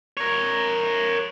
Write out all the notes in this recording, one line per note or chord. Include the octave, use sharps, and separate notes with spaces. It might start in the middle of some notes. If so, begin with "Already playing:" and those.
A#4 C#5